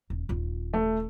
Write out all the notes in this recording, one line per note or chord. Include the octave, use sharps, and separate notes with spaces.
D#1
D#1 F4
A3